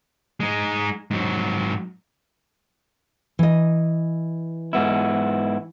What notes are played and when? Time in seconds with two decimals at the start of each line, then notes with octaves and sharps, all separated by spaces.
0.40 G#3 D#4
1.11 G#2 F#3
3.39 E3 D#5
4.73 G#2 B3 E4